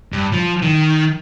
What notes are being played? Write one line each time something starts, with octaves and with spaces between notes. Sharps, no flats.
G2
F3
D#3